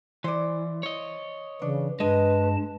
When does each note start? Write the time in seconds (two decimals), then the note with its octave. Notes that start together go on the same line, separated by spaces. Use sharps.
0.24 E3 C5 D5
0.83 C#5 D#5
1.62 C#3 E3 D4
2.00 G2 G#3 B4 D#5 A5